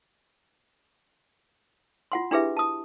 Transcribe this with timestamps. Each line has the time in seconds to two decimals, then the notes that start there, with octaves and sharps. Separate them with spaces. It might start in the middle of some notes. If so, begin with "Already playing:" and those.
2.12 F4 F#5 C6
2.31 D4 E4 G4 G#4 B4 E5
2.57 A5 D#6